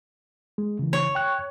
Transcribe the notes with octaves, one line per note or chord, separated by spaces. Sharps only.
G#3
C#3 E3
C#5
G5 C#6 F#6